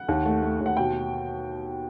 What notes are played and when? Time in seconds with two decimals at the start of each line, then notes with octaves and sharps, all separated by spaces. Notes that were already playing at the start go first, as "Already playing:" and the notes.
Already playing: F#5
0.08 D#2
0.25 A3
0.43 A3
0.60 D#2
0.66 F#5
0.77 B2 G5